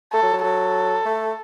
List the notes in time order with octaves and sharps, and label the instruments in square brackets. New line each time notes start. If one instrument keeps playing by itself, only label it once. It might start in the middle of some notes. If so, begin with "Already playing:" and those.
[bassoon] A3 [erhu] A4
[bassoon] F#3
F#3
[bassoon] F#3 [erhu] A4
[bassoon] A3